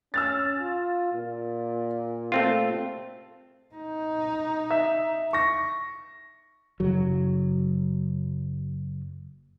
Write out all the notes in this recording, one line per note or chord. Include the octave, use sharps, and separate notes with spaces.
C#4 E6 F6 A6
F4
A#2
A3 C4 F4
D#4
E5
C#6 A#6
F#1 F#3